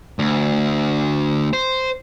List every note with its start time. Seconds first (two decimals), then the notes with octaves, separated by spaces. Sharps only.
0.19 D2
1.53 C5